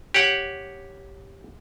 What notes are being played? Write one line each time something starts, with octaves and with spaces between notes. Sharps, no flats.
G4 C#5 F#5